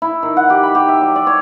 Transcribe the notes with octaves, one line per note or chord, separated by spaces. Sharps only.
E4
D#3
F#5
G4
B5
G4
E5
F#3
D5
C#5